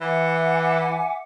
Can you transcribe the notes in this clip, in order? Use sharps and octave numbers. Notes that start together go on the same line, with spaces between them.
E3 E5 F#5 D6
G#5